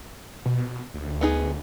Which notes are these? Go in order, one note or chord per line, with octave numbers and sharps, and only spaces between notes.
B2
D2
B3 D#4 G#4